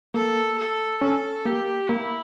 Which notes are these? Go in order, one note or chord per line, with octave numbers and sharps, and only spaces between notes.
A#3 A4
A4
C#4 A4
A#3 G4
A#3 E4